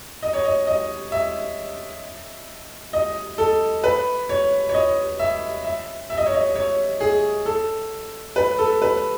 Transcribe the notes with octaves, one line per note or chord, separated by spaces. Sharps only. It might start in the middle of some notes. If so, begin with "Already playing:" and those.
D#5
C#5
D#5
D#5
E5
D#5
A4
B4
C#5
C#5
D#5
E5
E5
E5
D#5
C#5
D#5
C#5
G#4
A4
B4
A4
B4